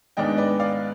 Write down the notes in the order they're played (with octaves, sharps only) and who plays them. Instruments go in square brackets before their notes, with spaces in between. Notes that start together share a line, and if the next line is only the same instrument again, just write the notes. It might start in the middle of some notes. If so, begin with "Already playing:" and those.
[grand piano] G#2 D#3 G#3 B3 D4 D#5 G5
B4 D5
D5 F5